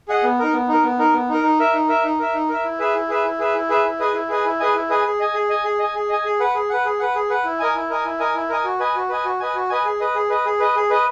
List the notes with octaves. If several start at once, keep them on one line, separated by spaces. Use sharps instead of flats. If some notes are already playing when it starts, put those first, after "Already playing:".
G#4 D#5 F#5
B3
D#4 A#4
B3
D#4 A#4
B3
D#4 A#4
B3
D#4 A#4
D#4
A#4 E5
D#4
A#4 E5
D#4
A#4 E5
D#4
A#4 E5
E4
G#4 B4 E5
E4
G#4 B4 E5
E4
G#4 B4 E5
E4
G#4 B4 E5
E4
G#4 B4 D#5 G#5
E4
G#4 B4 D#5 G#5
E4
G#4 B4 D#5 G#5
E4
G#4 B4 D#5 G#5
G#4
D#5 G#5
G#4
D#5 G#5
G#4
D#5 G#5
G#4
D#5 G#5
G#4
B4 F#5
G#4
B4 F#5
G#4
B4 F#5
G#4
B4 F#5
E4
A#4 D#5 G#5
E4
A#4 D#5 G#5
E4
A#4 D#5 G#5
E4
A#4 D#5 G#5
F#4
B4 D#5 G#5
F#4
B4 D#5 G#5
F#4
B4 D#5 G#5
F#4
B4 D#5 G#5
G#4
B4 D#5
G#4
B4 D#5
G#4
B4 D#5
G#4
B4 D#5